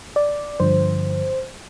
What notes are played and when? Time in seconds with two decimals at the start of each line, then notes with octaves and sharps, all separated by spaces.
0.16 D5
0.60 G2 D3 F3 C5